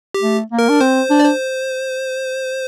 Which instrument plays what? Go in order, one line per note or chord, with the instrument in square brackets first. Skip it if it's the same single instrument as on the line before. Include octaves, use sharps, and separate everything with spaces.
[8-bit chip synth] G4
[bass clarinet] A3
A#3
[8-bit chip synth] A#4
[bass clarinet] D4
[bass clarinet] C4 [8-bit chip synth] C5
[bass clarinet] D4
[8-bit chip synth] D5
C5